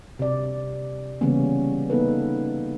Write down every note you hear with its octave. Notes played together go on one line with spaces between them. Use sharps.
C3 D5
C#3 E3 G3 A#3 B3 C#4
A#3 B3 D#4 A4 B4